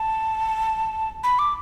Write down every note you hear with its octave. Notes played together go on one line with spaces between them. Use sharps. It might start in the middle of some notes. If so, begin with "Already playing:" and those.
Already playing: A5
B5
D6